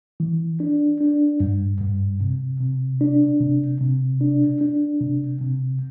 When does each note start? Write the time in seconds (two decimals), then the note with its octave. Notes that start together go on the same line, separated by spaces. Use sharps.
0.20 E3
0.60 D4
1.01 D4
1.40 G2
1.81 G2
2.21 C3
2.60 C3
3.01 D4
3.41 C3
3.81 C3
4.21 D4
4.61 D4
5.01 C3
5.41 C3